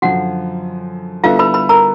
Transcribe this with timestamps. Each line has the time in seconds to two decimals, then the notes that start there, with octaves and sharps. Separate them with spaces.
0.02 F#2 D3 F3 F#4 F#5
1.24 D3 G3 B3 E4 F4 A4 F5
1.39 B4 B5
1.54 B4 B5
1.69 A#4 A#5